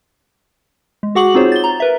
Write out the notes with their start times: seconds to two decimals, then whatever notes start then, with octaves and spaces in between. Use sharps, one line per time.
1.03 G#3
1.15 F#4 G#4 F#5 C#6 D6 F#7
1.34 C4 D#4 F4 G#4 C5 C#5
1.52 A6 G7
1.64 A#5
1.80 A#4 B4 E5